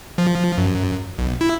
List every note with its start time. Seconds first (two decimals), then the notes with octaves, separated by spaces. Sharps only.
0.18 F3
0.58 F#2
1.19 B1
1.41 E4